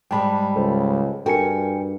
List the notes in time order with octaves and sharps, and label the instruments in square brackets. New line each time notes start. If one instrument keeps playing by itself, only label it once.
[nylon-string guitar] G#2 G3 G#3 [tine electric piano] G5 A5 B5
[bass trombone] C#2 [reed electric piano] A4 C5
[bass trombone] G2 [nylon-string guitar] F#4 [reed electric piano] A4 A#4 G#5 [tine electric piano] G5 C#7